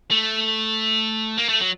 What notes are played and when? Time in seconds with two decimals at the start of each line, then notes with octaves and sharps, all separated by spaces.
0.11 A3
1.38 A#3
1.49 A3
1.60 F#3